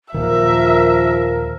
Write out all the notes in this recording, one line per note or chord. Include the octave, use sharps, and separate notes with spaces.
D#2 A#2 D#3 F3 A#4 E5